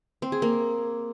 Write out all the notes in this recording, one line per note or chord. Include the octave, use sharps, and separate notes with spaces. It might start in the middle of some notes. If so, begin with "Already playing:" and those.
C4
G#4
A#3